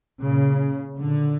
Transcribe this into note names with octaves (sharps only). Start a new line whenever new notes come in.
A#2 C#3
A#2 D3